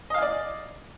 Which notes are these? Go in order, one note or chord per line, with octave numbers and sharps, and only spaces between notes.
D5 D#5 F5 G#5